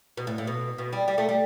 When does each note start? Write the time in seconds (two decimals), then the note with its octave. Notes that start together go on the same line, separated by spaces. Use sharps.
0.17 B2
0.27 A2
0.38 A2
0.47 B2
0.78 B2
0.93 G3
1.08 G3
1.18 A3
1.29 G3